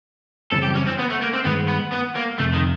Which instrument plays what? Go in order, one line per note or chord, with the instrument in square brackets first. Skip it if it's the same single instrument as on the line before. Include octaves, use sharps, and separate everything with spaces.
[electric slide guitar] F#2 C#3 E3 G3 C4 [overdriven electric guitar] A4
[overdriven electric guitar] G4
C#4
C4
B3
A3
A#3
C4
[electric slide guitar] G2 D#3 G#3 [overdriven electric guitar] B3
[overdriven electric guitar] B3
B3
A#3
[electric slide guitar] F2 C3 [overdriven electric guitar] A3
[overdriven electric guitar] D#3